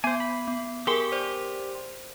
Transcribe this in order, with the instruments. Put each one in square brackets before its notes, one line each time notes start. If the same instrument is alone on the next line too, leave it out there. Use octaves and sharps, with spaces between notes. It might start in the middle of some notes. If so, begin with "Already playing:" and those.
[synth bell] B3 [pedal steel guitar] C5 G#5
[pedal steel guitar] B5
[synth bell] B3
[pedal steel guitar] G4 C6 [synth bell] G#4 A#4 G#5
[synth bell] C5 D5